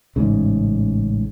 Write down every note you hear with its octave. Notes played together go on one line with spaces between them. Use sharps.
A1 G#2 C#3